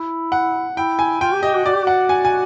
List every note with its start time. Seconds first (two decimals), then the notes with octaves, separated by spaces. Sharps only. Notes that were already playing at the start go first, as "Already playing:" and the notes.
Already playing: E4
0.32 F#5
0.76 E4 G5
0.99 G#5
1.21 F4 G5
1.32 G4
1.43 G4 D#5
1.54 F#4
1.65 F#4 D5
1.75 G4
1.84 F#4 F#5
2.09 G#5
2.25 G#5